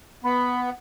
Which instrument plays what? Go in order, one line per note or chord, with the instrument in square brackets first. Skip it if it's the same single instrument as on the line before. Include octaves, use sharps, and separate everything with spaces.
[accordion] B3 [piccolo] B5